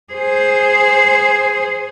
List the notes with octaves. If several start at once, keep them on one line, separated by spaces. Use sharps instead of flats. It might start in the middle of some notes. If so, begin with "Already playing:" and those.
G#4 C5